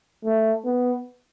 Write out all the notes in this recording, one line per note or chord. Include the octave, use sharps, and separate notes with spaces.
A3
B3